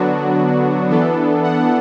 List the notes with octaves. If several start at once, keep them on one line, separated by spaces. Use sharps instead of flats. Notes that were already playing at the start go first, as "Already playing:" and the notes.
Already playing: D3 F#3 B3 D4 F#4
E3 B3 D4 A4
F#5